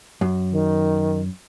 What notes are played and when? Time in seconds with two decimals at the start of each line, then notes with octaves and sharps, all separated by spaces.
0.21 F#2
0.51 D#3